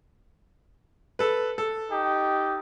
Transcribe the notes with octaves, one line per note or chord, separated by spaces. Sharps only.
A4 B4
A4
D#4 G4